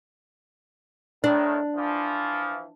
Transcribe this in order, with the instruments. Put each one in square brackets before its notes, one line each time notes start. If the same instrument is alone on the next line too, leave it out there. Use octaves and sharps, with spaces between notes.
[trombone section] A2 D#3 [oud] D4
[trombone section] E3 F3